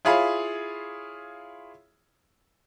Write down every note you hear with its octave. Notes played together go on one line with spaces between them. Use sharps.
E4 F4 G#4 C#5 F5 B5